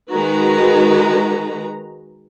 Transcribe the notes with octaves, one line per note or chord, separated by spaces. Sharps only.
D#3 G#3 F#4 B4 A#5